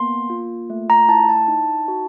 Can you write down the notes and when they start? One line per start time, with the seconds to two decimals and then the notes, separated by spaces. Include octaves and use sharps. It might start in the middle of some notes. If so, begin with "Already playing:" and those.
Already playing: A#3 B3 C6
0.30 F4
0.70 A3
0.90 A#5
1.08 E4 A5
1.29 A5
1.48 D#4
1.88 F#4